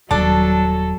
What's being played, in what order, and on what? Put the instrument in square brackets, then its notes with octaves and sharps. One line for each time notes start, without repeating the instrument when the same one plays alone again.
[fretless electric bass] D#1 [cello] F#3 [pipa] D4 [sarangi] A4